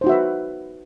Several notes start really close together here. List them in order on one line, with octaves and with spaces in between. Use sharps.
C5 D#4 F#4 E5 B4